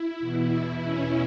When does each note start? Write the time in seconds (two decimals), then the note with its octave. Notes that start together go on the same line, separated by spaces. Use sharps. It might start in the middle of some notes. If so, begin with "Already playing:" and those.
Already playing: E4
0.20 E2 B2
0.53 E4
0.85 C#4